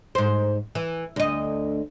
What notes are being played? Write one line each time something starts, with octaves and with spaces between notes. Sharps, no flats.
G#2 C5
E3
D2 D#5